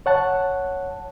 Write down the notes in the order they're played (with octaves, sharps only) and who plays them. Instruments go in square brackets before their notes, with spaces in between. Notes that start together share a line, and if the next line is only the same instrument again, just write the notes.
[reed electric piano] C#5 F#5 A5